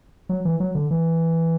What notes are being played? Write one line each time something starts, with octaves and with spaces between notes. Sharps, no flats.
F#3
E3
F#3
D3
E3